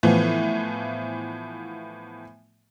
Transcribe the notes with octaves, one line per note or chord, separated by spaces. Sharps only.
A2 E3 F3 B3